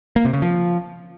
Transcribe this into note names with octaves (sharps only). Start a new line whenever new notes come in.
A#3
C3
C#3
F3